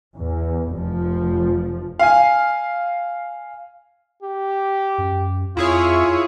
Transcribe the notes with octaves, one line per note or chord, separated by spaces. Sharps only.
E2
F1 F3
F5 G#5
G4
F#2
F2 E4 F4 G#4 C#5